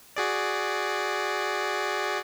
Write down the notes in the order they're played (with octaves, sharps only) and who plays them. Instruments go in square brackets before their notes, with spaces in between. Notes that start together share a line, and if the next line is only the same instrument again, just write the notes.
[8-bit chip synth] F#4 G#4 D5